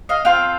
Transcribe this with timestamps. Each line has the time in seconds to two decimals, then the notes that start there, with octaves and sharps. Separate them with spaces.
0.09 D#5 F5
0.25 C4 F4 A4 F5 G5